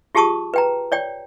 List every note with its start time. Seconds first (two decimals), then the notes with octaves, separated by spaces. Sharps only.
0.15 F4 G4 G#4 A5 C#6 D#6
0.54 B4 G5 A#5
0.92 C#5 D5 G5